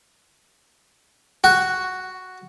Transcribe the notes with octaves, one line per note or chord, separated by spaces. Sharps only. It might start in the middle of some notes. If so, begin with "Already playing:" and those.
F#4